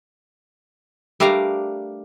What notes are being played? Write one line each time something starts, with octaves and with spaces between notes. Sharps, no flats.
G3 A3 D4 A#4 F5 A#5